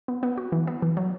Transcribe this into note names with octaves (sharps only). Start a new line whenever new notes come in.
B3
B3
F#4
E3
B3
E3
F#3